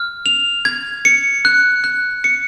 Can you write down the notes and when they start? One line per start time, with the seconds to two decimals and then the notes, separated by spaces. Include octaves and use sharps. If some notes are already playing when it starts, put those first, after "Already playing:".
Already playing: F6
0.26 F7
0.65 G#6
1.05 C#7
1.45 F#6
1.84 F#6
2.24 C#7